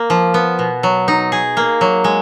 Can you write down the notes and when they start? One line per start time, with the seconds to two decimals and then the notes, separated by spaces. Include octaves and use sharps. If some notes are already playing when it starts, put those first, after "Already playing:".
Already playing: A#3
0.10 F3
0.34 B3
0.59 B2
0.83 F#3
1.08 D#4
1.32 G#4
1.57 A#3
1.81 F#3
2.04 G#3